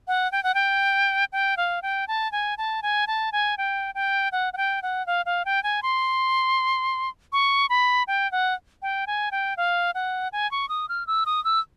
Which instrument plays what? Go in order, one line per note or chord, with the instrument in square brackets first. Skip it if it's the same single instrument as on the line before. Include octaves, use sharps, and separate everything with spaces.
[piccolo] F#5
G5
F#5
G5
G5
F5
G5
A5
G#5
A5
G#5
A5
G#5
G5
G5
F#5
F#5
G5
F#5
F5
F5
G5
G#5
C6
C#6
B5
G5
F#5
G5
G#5
G5
F5
F#5
G#5
C#6
D#6
F6
E6
D#6
E6